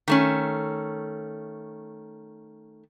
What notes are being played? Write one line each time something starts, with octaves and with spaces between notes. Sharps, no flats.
D#3 A3 C#4